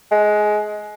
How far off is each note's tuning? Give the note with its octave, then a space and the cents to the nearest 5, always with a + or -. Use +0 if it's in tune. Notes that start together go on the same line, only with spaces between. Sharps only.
G#3 +15